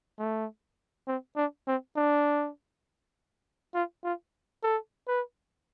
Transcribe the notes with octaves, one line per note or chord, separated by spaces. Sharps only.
A3
C4
D4
C4
D4
F4
F4
A4
B4